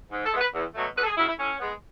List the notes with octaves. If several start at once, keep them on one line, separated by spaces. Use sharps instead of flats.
G#2
A4
E3 G#3 B3
B4
E2
B2 F#3 A3
E2 B4
A4
G#4
C#3 F#3 E4
E4
A2 C#4
G#3 B3